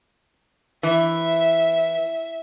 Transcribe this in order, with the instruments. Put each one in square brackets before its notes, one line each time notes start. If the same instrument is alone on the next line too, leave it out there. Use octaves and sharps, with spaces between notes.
[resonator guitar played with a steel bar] E3 [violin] E5